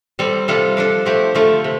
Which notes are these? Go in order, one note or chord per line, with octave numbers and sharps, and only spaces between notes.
G3 C4 A4
C3 G3 F4 A4
F3 D4 A4
F3 A3 C4 G4
D3 A3 F4 A4
C3